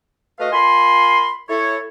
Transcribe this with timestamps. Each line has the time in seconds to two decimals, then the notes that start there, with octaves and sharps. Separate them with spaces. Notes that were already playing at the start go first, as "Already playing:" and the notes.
0.38 A3 F#4 B4 D#5 F5
0.52 F4 A#4 G#5 B5 C6
1.48 E4 A4 C#5